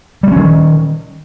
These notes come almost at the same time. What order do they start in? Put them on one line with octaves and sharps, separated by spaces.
G3 A#3 C#4 D#3